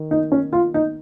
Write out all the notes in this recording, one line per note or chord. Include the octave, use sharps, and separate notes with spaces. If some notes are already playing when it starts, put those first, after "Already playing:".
Already playing: D#3
D#4
C#4
F4
D#4